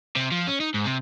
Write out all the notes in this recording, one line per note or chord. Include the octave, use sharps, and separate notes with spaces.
C3
F3
C#4
D#4
G#2
C3